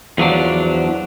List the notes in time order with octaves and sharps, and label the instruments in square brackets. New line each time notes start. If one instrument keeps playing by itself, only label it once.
[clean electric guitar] E2 F3 F#3 D4